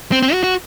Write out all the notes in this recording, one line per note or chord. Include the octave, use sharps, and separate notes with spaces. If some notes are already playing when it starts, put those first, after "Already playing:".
C4
C4
F#4
F#4